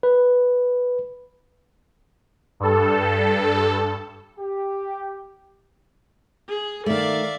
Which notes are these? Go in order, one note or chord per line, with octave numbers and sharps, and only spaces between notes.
B4
G2 A4
G4
G#4
D#3 A3 D5 E5 F5